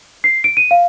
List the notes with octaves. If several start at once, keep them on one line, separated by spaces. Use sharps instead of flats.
C7
D7
D#7
F5